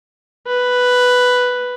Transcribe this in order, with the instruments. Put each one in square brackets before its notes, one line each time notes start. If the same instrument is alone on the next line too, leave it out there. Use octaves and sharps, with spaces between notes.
[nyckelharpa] B4